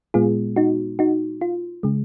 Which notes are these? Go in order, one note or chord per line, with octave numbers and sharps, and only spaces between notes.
A#2 G#3 B3 F4 G#4
D#4 F#4
D#4 F#4
F4
C#3 G#3